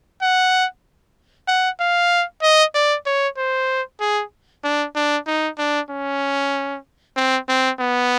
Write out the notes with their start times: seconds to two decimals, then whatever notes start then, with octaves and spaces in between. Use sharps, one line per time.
0.22 F#5
1.48 F#5
1.80 F5
2.42 D#5
2.74 D5
3.06 C#5
3.38 C5
4.01 G#4
4.64 D4
4.96 D4
5.27 D#4
5.58 D4
5.90 C#4
7.16 C4
7.49 C4
7.80 B3